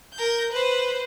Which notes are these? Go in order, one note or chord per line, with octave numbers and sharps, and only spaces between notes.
A#4 G6
B4 C5